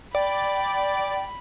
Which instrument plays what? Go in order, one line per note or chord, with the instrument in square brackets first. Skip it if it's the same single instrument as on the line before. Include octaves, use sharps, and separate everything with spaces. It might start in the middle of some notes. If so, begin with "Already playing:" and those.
[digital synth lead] D5 [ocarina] G5 [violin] B5